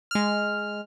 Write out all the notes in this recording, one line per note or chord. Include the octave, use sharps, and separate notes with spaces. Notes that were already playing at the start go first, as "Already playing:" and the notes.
G#3 F6